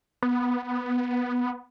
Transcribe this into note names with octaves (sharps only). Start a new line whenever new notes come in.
B3